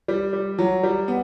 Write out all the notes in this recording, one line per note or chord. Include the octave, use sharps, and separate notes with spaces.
G3
G3
F#3
G3
B3